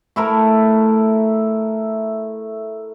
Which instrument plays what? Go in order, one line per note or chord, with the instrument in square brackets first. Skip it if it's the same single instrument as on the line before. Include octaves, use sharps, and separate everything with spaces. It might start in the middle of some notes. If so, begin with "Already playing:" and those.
[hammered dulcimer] A3 E4 A#4